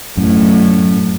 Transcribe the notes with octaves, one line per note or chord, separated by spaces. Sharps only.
F#2 A2